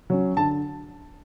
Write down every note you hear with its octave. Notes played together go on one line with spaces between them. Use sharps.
F#3 C#4
D3 A5